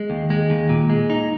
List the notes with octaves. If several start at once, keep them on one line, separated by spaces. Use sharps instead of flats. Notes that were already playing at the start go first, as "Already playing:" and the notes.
Already playing: G#3
D#2
G#3
D#2
A#2
G#3
D#4